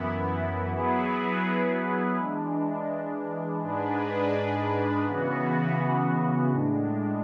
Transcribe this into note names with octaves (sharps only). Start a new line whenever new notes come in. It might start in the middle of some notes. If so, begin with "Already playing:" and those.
Already playing: F#2 E3 B3 E4
F#3 B3 E4 G#4 B4
E3 G#3 D4
G#2 G#3 D4 G#4 B4
C#3 E3 B3 F#4
A2 G#3 D4